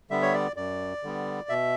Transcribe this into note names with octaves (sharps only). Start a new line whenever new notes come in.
D3 G3 B3 E5
C#5
D5
F#2 D5
D3 G3 B3
B2 E5